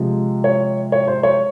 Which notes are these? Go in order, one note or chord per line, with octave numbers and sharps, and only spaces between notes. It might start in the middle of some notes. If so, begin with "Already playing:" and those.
Already playing: C3 F3 G#3
C#5
C#5
C5
C#5